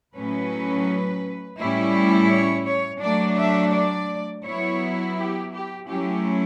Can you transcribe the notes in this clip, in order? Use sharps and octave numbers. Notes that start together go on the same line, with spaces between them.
A2 F#3 C#4 B4
A2 G3 C#4 E4
C#5
C#5
F#3 A3 D4 D5
E5
D5
F#3 B3 E4 C#5
G4
G4
F#3 A3 C#4 E4 G4